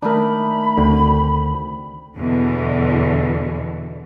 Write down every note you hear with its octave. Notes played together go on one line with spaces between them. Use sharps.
D#3 A3 D4 A#4 B5
D2 D3 C4
E2 B2 D3 E3